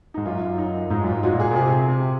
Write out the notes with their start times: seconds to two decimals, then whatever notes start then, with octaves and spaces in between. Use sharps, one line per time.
0.14 G#2 D#4
0.26 F#2 F4
0.58 D#4
0.90 G#2 D#4
1.04 F#2 F4
1.12 G#2
1.23 G#2 F#4
1.33 A#2
1.40 G#4
1.51 A#2
1.55 C3 G#4
1.88 C3